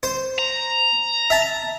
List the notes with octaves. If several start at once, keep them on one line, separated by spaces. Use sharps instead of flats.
C5
A#5
E5 A5